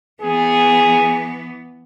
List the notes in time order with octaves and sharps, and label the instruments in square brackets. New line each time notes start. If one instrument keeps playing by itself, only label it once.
[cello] E3 B3 [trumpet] G#4